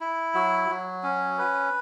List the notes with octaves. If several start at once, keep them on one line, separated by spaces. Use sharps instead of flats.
E4
F#3
F#3
C#4
B4